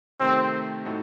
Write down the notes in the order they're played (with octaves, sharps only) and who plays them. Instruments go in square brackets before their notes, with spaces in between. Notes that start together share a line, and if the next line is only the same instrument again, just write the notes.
[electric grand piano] C3 D#3 A3 [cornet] C4
[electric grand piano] A2 A3 D#4 F#4 A4